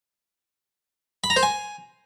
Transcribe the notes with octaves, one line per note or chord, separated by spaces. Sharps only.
B5
A#5
C5
G#5